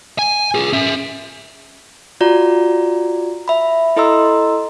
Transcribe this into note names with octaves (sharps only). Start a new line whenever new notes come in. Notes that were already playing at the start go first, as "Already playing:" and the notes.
G#5
F4 G#4
C#4 E5
F4 F#4 D5 A#5
E5 B5
E4 A4 D#5 A#5 C6 E6